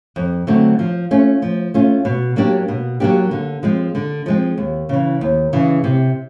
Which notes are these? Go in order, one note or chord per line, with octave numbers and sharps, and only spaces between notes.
F2
D3 F#3 A3 C4
F3
A3 C#4 F4
F3
A3 C#4 F4
B2
F#3 A#3 D4 G4
B2
F#3 A#3 D4 G4
D3
F3 G#3 C4
D3
F3 G#3 C4
D#2
C#3 E3
D#2
C#3 E3
C3